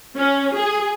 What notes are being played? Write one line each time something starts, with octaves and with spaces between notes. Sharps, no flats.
C#4
G#4